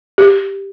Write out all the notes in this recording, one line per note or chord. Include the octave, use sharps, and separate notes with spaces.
G4